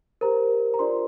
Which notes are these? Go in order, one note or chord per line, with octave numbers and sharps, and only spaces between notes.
G4 A#4 C5 A#5
A#5
D4 F4 A#4 C5 D5 C6